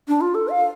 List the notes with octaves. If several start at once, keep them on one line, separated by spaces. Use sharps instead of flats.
D4
F4
A4
F5